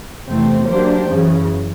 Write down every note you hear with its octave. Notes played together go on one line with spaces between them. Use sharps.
E2 C3 E3 A3 C4
F#3 A#3 D4 G4 C5
F#2 C#3 E3